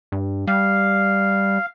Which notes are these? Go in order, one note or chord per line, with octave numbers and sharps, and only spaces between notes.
G2
G3 F5